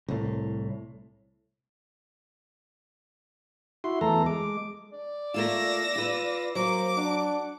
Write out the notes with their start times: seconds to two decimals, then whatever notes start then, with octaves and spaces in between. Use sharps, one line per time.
0.09 C2 A2
3.84 E4 F#4 C6
4.01 E2 A3 A4 A#5
4.26 G#3 D6
4.93 D5
5.34 A3 A#3 F4 E6 A#6
5.96 F4 B4
6.55 F#3 A#3 C5 D6
6.97 D4 F#5